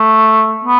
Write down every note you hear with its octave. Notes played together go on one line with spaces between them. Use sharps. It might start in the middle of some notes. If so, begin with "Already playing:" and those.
Already playing: A3
B3